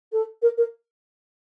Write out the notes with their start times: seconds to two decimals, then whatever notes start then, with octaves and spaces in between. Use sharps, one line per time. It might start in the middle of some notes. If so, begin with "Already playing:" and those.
0.12 A4
0.42 A#4
0.57 A#4